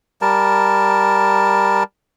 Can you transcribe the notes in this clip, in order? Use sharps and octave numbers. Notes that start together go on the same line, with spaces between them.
G3 A#4 A5